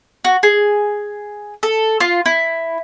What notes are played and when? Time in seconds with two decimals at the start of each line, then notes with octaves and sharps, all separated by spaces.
0.25 F#4
0.43 G#4
1.63 A4
2.00 F4
2.26 E4